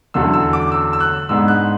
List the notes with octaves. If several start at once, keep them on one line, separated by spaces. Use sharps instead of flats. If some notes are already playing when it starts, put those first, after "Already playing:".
E2 D3 F#3 A3 C#4 E6
E6
D6
E6
E6
F#6
G#2 G#3 B3 D4 E6
F#6